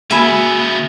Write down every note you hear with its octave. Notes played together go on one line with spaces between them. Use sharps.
C#3 G#3 A#3 B3 F#4 E5 G#5 B5